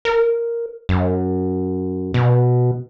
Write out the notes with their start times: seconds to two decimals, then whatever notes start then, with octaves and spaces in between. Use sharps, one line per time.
0.05 A#4
0.89 F#2
2.14 B2